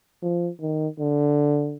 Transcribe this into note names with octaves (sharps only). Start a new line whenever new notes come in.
F3
D#3
D3